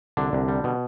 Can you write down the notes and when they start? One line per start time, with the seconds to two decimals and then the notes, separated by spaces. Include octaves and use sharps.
0.17 C2 D3 D4
0.33 C2
0.48 G3
0.64 B2